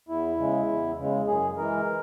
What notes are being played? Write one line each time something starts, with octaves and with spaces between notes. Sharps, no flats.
E2 E4
C#3 G#3
E2
C#3 G#3
F#2 G#4
E3 G#3 A#4